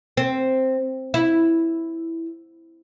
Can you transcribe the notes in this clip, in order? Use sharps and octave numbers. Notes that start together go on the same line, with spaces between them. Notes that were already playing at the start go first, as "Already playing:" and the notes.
C4
E4